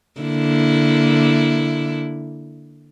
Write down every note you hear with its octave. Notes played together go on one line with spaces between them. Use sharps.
D3 A#3 E4